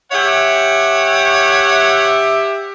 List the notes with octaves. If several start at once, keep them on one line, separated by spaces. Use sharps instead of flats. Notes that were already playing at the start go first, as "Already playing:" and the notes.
G4 C#5 E5 F#5